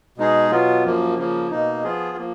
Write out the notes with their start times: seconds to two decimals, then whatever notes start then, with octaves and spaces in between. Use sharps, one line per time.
0.18 B2 G#3 D#4 G#4
0.51 B2 F#3 B3 F4
0.84 F#2 F3 A#3
1.17 C#3 F3 A#3
1.51 B2 A#3 D#4
1.83 F3 B3 F4 G#4
2.17 F3 A#3